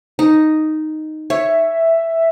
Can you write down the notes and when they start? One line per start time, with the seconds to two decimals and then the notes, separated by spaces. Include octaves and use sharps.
0.19 D#4
1.30 C#5 E5